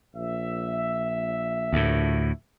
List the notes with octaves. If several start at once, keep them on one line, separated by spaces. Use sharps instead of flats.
A#1 E5
D2 A2